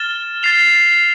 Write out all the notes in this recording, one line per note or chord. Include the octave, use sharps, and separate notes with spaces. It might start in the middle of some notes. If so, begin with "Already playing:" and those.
Already playing: F6 A6 E7 G7
A6 C7 F7